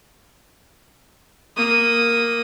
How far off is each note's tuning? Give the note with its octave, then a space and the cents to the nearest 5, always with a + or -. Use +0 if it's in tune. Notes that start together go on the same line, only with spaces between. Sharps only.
A#3 +0 D#6 +0